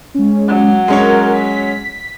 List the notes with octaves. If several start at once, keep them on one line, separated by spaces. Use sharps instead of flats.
G#3 C#4
F#3
G#3 C#4 A#4 C#5
B6